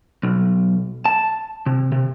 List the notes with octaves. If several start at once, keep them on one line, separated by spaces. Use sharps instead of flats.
B1
A5
C3
C3